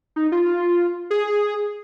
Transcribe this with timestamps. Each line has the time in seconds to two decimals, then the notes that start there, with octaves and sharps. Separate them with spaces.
0.16 D#4
0.32 F4
1.11 G#4